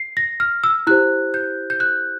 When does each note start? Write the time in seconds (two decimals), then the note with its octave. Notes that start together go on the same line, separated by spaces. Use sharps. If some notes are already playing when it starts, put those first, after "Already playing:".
Already playing: C7
0.17 A#6
0.40 F6
0.64 E6
0.87 E4 G4 C5 F#6
1.34 G6
1.70 G6
1.80 F#6